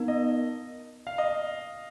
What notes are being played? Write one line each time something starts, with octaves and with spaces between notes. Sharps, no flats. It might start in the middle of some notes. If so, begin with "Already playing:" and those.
Already playing: B3 D#4 A#4
D#5
F5
D#5